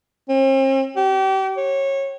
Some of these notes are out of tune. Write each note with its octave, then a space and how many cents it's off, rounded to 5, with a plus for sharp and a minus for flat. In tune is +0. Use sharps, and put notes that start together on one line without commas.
C4 +45
G4 -35
C#5 -20